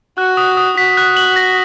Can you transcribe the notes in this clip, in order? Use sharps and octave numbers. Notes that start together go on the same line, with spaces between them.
F#4 F#6
D#6
D#6
F#4 B6
F#6
F#7
A#6